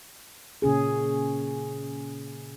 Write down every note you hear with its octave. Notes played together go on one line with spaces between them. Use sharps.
A#2 C#3 C#4 G#4